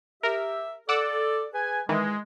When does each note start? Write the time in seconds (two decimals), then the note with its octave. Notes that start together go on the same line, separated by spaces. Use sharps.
0.23 G4 A#4 E5
0.89 A4 D5 F#5 D6 E6
1.54 G#4 B4 G#5
1.89 D#3 E3 G#3